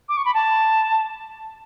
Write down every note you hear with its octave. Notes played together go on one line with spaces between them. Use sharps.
D6
C#6
B5
A5